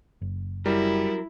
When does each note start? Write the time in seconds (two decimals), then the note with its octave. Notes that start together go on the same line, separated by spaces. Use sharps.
0.21 F#1
0.66 F#3 G3 E4 A#4